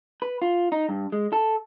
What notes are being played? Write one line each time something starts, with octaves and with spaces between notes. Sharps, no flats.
B4
F4
D#4
G2
G#3
A4